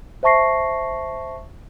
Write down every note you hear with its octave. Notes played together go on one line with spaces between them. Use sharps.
C5 E5 A5 C#6 A#6 C7